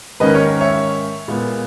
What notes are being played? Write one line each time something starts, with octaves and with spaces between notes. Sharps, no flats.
G#2 D#3 A#3 C#4 B4 D#5
A#4 C#5
C#5 E5
A#2 G#3 B3